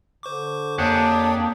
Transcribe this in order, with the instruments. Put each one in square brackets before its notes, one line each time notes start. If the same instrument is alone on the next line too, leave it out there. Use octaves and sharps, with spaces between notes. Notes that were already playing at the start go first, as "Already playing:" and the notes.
[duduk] D3 [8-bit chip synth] C5 C#6 D6
[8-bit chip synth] F2 C#5 [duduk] A#3 [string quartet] D4 [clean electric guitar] G4 G#4 F#5